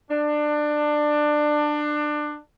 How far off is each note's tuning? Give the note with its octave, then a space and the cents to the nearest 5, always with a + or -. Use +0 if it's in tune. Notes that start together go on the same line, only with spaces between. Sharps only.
D4 +20